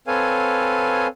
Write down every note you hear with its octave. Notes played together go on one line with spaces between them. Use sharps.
C4 A4 B4 C#5 F5 G#5